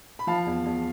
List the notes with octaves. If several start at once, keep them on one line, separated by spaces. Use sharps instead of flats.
B5
F3 F5 A5
E2
E2